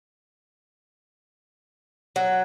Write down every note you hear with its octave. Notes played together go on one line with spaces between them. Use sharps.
F#3